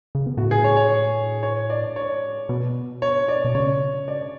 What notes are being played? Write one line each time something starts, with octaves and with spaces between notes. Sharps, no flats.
C#3
B2
A2 F#4
G#4
C#5
C#5
C#5
D5
C#5
B2
C#5
D5
B2
C#3 C#5
D5